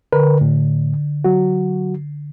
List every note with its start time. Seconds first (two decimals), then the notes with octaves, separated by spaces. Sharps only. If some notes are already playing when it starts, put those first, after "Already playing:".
0.13 D3 A#4 B4
0.41 A2
1.24 F#3 F#4